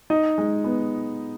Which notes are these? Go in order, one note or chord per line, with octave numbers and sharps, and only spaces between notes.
D#4 D#5
G#3
B3